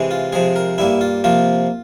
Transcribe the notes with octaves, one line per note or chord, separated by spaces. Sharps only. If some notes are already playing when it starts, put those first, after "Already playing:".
Already playing: C3 E3 G#3
F4
C3 F3 G#3 G#4
A#4
G2 G3 A#3 E4
F4
C3 F3 A#3 F4